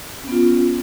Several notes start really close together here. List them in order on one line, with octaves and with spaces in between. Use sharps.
C#4 B3 F4